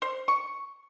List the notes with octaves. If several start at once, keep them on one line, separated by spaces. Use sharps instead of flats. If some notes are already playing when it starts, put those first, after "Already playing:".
C5
C#6